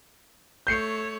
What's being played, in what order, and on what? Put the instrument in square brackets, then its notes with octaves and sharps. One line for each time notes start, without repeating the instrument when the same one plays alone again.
[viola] A3 C#5 [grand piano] G6 C7 C#7